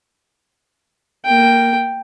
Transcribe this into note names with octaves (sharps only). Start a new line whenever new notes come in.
A#3 G5